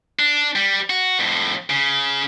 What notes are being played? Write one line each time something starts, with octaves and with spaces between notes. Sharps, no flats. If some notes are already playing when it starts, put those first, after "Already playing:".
D4
G3
F#4
F2 A2
C#3